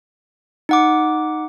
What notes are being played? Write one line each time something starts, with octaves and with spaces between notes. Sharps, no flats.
D#4 F#5 D6